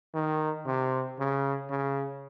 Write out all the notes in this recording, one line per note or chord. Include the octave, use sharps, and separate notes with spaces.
D#3
C3
C#3
C#3